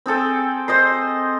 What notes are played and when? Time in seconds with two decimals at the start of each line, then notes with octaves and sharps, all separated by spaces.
0.06 C4 G#4 A4 G5
0.68 C5 D#5 C6